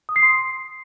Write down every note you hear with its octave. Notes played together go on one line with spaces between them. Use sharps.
D#6
C7
C6